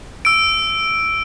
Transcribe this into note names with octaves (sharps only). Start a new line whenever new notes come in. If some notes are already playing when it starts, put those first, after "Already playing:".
E6 D7